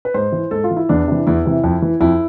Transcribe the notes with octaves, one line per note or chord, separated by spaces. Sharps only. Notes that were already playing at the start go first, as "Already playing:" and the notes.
B4
G#2 C5
E3
G#2 A4
F4
E3
E4
E2 D4
C3 E3
E2 E4
C3 E3
F2
E3
F2 E4